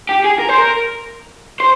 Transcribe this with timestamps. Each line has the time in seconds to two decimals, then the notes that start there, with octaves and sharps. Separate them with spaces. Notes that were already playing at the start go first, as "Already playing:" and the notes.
0.09 G4
0.24 G#4
0.39 A#4
0.49 C5
0.59 A#4
1.60 C5